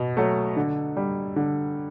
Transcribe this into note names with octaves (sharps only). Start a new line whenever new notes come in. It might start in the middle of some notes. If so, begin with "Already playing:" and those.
Already playing: B2
F#3 A3
D3
G3
D3